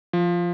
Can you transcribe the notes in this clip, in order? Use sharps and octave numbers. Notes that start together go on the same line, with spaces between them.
F3